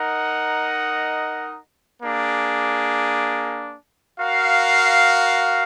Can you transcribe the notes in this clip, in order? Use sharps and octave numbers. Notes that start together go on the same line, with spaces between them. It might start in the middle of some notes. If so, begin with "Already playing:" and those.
Already playing: D#4 A#4 D#5 F#5
A#3 D4 G#4
F#4 A#4 F5